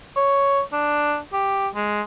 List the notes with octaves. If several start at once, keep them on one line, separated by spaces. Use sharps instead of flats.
C#5
D4
G4
G#3